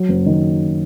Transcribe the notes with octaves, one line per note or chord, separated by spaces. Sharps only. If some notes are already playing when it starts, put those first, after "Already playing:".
Already playing: F#3
F#1
D#3